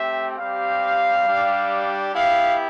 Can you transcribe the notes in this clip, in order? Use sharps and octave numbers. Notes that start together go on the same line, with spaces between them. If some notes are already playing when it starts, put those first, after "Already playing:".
Already playing: A3 C4 G4 E5
G3 C4 G4 F5
G3 D4 G4
B3 E4 G4 F5